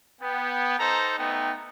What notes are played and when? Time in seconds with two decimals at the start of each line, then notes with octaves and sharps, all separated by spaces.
0.21 B3 G5
0.79 D#4 A4 C5 A#5
1.19 A3 B3 D#4 G5